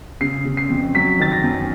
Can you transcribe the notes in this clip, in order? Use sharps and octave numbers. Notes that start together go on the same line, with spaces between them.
C#3 C7
C#3
C7
F2
F#3 B6
D#3 A6
A#6
F#2